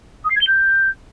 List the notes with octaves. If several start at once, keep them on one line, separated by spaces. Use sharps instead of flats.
D#6
C7
G#6
G7
G6